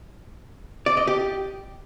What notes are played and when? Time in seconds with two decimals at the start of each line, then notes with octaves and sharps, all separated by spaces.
0.86 D5
0.97 D#5
1.07 G4